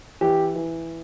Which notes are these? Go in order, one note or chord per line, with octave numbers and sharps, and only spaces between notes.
E3 G4
E3